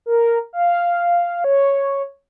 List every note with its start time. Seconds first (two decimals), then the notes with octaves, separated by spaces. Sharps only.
0.06 A#4
0.53 F5
1.44 C#5